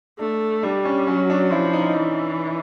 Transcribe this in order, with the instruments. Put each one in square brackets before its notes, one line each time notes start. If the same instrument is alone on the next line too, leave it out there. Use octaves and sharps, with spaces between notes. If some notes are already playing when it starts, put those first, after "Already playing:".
[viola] A3 [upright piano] D4
[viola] G3 [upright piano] D4
[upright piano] C#4
[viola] F#3 [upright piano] C#4
[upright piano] D4
[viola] F3 [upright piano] E4
[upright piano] D#4
[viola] E3